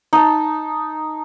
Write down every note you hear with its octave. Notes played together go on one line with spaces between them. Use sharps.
D#4 A5